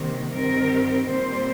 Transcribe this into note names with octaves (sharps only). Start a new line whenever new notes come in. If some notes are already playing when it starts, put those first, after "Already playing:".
Already playing: C3 D#3 G3 A#3
G2 D#3 G3 C4 A#4
A#2 G3 C4 C5